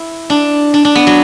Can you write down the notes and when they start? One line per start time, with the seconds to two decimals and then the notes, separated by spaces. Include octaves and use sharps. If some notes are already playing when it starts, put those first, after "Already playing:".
Already playing: E4
0.30 D4
0.74 D4
0.85 D4
0.95 B3
1.07 F#3